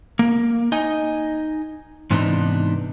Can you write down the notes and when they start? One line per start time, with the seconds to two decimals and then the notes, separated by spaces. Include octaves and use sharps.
0.19 A#3
0.72 D#4 D#5 G#5
2.11 G#2 C3 E3 B3 D4 D#4